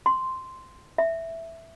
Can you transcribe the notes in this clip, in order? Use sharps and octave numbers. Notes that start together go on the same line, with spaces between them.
C6
E5